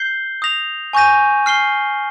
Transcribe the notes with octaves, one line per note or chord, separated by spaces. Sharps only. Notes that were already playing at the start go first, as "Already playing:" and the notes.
Already playing: G6 C7 G7
D#6 A#6 F7
G#5 C#6 G6 A#6 D#7
F6 C7 G7